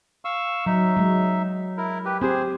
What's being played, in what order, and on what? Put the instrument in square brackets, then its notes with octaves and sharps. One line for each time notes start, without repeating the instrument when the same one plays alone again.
[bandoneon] F5 C#6 E6
[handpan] F#3 [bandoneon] D#4 E5
[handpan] F#3 G#3
[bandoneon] E4 A#4
G4 B4
[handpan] C4 G4 [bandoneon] G#4 C5